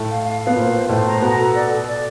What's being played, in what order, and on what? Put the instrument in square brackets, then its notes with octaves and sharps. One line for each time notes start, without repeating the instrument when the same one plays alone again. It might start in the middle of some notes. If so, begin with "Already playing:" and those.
Already playing: [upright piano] A2 A3
[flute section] F5
F5
F5
[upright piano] B3
[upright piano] A#2 A#3 [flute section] C5
[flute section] C5
[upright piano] A2 A3 [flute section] C5
[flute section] A#5
[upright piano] B2 B3 [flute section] F#5
[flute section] A4
D5
A4
D5